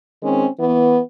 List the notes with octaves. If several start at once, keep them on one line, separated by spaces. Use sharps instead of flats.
D#3 G#3 C4 C#4
E3 B3